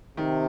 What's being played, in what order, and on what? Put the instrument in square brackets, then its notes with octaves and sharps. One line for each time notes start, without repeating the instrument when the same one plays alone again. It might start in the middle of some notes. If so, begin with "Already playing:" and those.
[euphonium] C3 [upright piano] D#3